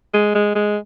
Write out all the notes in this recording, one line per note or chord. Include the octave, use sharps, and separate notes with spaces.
G#3
G#3
G#3